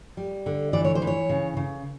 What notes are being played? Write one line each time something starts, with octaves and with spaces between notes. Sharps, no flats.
G3
D3
E3 D5
C#5
C5
E3
C#5
C#3
C#3